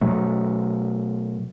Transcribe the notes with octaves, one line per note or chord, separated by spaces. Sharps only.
B2 F#3 A3